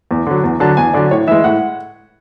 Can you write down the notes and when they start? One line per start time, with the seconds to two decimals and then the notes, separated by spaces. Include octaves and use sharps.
0.11 E2
0.27 D3 F#3
0.43 E2
0.60 D3 F#3 A5
0.77 E2 G#5
0.94 D3 F#3 D5
1.11 A2 C#5
1.27 E3 G#3 E5
1.44 A2 F#5